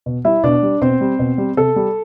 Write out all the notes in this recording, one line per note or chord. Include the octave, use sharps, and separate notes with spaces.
B2
G3 E4 E5
B2 D4 D5
G3
B2 C4 C5
G3
B2
G3
C3 A4
G3